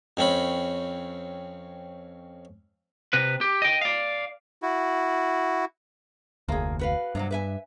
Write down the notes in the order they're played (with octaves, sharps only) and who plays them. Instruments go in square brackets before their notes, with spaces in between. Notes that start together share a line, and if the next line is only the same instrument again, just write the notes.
[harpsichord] F2 C4 C#4 B5
[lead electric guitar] C3 B4
G4
D#5 G5
D5 F5
[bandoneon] E4 F#4
[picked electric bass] F1 D2 [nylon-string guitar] A#3 G#4
[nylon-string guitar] F#4 B4 F5
[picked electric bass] G2 [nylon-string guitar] C3 F3 F#3
[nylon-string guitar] B4 E5 G#5